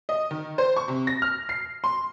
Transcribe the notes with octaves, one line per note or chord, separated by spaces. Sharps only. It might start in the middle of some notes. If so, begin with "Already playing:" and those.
D#5
D#3
C5
C#6
C3
A#6
F6
C7
C6